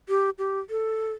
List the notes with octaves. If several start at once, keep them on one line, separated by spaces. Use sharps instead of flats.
G4
G4
A4